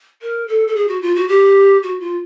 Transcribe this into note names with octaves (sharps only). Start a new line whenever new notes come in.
A#4
A4
A4
G#4
F#4
F4
F#4
G4
F#4
F4